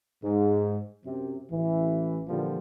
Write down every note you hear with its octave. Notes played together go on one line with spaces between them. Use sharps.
G#2
F#2 C3
A1 E3
A#2 D3 E3 F3 G3